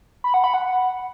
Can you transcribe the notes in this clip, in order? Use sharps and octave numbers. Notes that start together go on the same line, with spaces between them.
B5
F#5
B5
F#5